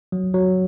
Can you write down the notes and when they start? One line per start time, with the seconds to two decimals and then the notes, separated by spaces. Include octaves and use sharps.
0.12 F#3
0.34 F#3